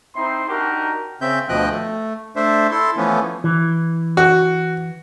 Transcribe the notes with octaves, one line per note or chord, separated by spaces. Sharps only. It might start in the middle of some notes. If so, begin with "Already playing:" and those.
C4 D#4 E4 C5 C6
D4 D#4 F#4 G4 A#4
C#3 C4 E5 G6
D2 B2 F3 D#5 G5 F#6
A3
A3 D4 C5 E5
E4 A4 C6
E3 F3 A3 B3 C#4
E3
F#4